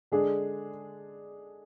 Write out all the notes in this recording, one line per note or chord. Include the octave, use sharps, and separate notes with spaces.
D3 G#3 D4 G#4